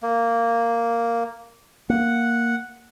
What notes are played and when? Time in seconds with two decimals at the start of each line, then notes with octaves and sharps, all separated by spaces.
0.03 A#3
1.90 A#3 F#5